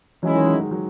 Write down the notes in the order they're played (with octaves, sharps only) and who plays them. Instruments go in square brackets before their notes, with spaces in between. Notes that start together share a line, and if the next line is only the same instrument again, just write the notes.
[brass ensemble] E3 G#3 C#4 E4 [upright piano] F#3
[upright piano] D#3
F#3
G#3
F#3